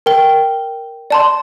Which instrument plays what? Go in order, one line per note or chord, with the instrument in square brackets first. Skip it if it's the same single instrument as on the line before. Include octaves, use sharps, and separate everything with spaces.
[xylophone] A#4 G5 G7
D5 A5 C6